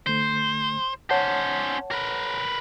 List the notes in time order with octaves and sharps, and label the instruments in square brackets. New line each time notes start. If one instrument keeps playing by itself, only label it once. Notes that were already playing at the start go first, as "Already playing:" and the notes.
[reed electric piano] D3 A3 [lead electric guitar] C5
[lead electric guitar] C#4 C5 [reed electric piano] C#5 F#5 A5
[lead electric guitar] A#4 B4